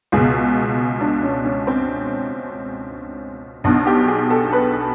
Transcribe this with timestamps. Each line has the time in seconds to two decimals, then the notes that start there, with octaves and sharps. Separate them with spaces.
0.12 C#2 B2 G#4
1.01 D4
1.23 C#4
1.45 C#4
1.67 C4
3.64 B1 B2 D4
3.87 G4
4.08 G#4
4.30 A4
4.53 B4